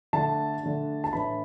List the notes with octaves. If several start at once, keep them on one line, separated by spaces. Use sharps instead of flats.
D3 A3 D4 A5
D3 A3 D4
A5
A2 E3 D4 B5